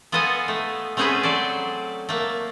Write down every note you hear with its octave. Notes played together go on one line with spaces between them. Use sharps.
B3 F4 A4 D#5 F#5 G#5
A3
A3 C4 C#4 F#4 G#4 B4
F#3 A4 C5 D5
A3 A#3